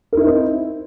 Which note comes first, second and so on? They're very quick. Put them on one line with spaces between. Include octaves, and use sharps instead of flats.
A#4 E4 D#4 C4